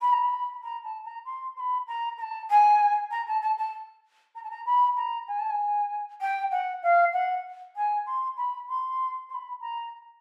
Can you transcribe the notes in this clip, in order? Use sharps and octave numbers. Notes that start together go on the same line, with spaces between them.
B5
A#5
B5
A#5
A5
A#5
C6
C6
B5
A#5
A#5
A5
G#5
A#5
A5
A5
A5
A#5
A5
A#5
B5
A#5
G#5
A5
G#5
G5
F#5
F5
F#5
G#5
C6
B5
C6
C6
B5
A#5